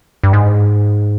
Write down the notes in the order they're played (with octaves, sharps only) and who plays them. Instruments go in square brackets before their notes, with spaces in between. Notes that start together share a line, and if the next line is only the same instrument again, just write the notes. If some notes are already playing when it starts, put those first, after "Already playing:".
[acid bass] G2
G#2